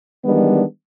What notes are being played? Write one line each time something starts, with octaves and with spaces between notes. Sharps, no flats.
D#3 E3 G3 G#3 B3 D4